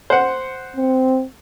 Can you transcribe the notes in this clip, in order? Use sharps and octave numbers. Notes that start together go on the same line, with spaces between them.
C5 F#5
C4